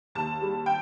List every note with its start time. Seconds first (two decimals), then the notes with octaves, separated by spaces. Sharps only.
0.15 D#2 A5
0.42 G3
0.66 G5